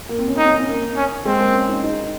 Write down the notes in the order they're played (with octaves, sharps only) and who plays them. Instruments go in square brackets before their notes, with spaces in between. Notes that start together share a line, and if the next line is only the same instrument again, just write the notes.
[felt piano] A#3
C4
C#4
[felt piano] C4 [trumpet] D#4
[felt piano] C#4
C4
A#3
[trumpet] C#4
[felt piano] G#3 [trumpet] C4
[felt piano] A#3
C#4
D#4
D#4